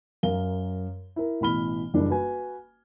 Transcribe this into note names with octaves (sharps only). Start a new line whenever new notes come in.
F#2 A#4 F5 G7
E4 A#4
A1 B2 E3 B5 F6 G7
F#1 E3 G3 A#3 D4
F#4 B4 G#5